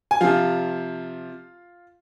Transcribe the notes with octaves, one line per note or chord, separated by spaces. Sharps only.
G#5
C3 F3 F4 F5